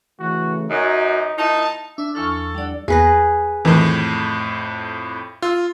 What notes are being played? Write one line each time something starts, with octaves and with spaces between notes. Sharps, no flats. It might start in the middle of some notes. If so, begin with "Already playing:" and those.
C#3 E3 A3 F#4
F#2 D#4 F#4
A#2 D#4 E4 A5
D4 E5
E2 F3 E4 A4 C#6 F6
G3 D4 D#4 D5 F#5
E2 G#4 B4 A#6
F2 A2 D#3 E3 D#4
F4 E6